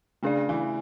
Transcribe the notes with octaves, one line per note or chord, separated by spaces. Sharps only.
C#3 A3 D4 G#4 D5
E3